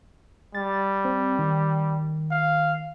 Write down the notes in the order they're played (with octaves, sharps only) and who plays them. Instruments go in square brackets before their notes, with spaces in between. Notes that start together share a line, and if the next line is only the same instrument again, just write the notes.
[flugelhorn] G3 [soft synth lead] A6
[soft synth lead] C4
D#3
[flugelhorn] F5